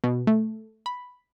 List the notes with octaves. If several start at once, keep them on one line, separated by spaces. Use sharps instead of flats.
B2
A3
B5